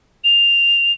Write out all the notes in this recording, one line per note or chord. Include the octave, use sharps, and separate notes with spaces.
F7